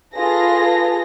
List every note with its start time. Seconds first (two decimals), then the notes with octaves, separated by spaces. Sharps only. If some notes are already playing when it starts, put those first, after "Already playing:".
0.13 F4 G#4 A4 B4 A#6